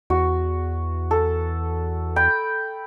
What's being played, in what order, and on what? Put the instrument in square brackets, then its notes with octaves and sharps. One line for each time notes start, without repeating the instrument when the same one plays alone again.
[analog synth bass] E2 [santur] F#4
[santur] A4
G5 B5